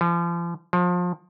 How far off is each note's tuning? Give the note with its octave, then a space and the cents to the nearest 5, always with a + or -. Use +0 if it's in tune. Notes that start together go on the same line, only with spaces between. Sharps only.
F3 -35
F3 +30